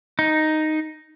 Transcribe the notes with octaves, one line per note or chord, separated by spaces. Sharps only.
D#4